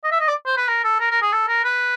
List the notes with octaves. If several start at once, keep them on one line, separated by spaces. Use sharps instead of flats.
D#5
E5
D#5
D5
C5
B4
A#4
A4
A#4
A#4
G#4
A4
A#4
B4